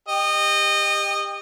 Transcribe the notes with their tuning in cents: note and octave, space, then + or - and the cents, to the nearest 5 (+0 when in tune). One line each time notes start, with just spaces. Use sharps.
G4 +20 D#5 -20